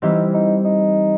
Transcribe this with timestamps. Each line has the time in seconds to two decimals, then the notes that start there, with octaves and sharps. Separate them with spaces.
0.02 E3 G3 C4 D#4 E4 G4
0.34 D#4
0.65 D#4